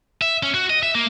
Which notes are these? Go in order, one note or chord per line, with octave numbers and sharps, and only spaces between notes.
E5
C#4
F#4
D#5
E5
A#3